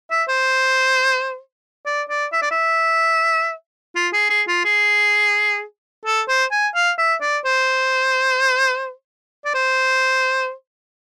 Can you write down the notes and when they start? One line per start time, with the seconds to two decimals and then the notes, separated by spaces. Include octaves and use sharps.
0.11 E5
0.29 C5
1.86 D5
2.09 D5
2.33 E5
2.42 D5
2.51 E5
3.96 F4
4.13 G#4
4.30 G#4
4.48 F4
4.65 G#4
6.05 A4
6.28 C5
6.51 G#5
6.75 F5
6.98 E5
7.21 D5
7.45 C5
9.45 D5
9.54 C5